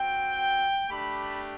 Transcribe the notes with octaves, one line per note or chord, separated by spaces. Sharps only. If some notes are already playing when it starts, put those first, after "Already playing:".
Already playing: C4 F#4 G5
A3 D4 G4 B5